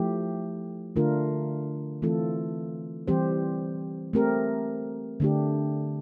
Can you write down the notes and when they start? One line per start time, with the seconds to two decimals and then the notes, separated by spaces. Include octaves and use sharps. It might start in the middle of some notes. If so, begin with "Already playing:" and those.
Already playing: F3 A3 E4 G4
0.96 D3 A3 D4 F4 A#4
2.02 E3 A3 C4 F4 A4
3.08 E3 G3 C4 G4 C5
4.13 A3 C4 G4 A#4
5.20 D3 A3 D4 G4